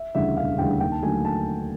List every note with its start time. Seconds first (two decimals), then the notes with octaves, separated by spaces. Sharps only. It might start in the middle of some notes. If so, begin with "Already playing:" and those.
Already playing: E5
0.15 D2 C#3 E3 G3 E5
0.37 E1 F5
0.58 D2 C#3 E3 G3 G5
0.80 D#2 G5
0.92 A5
1.03 D3 F#3 A3 G#5
1.25 A5